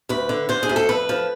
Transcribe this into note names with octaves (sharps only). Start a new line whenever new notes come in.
D2 B4
D3
D3 C5
G#4
D2
A4
F2 B4
F3